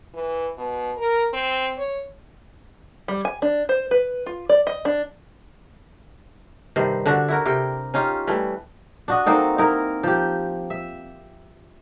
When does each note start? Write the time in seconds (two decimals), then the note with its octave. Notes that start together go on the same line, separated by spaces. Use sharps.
0.14 E3
0.58 B2
0.97 A#4
1.33 C4
1.78 C#5
3.08 G3
3.25 G#5
3.42 D4
3.69 C5
3.91 B4
4.26 F4
4.49 D5
4.67 D#5
4.85 D4
6.76 G2 C3 D#3 C5
7.06 D3 D4 F#4
7.28 E4 F#4 A#4
7.45 C3 A#4 G5
7.94 C#4 D#4 F4 G4
8.27 E3 G3 A3
9.08 D4 F#4 D#5
9.26 A#3 C4 D#4 A4
9.58 D#4 E4 A#4
10.03 F3 G4
10.70 E5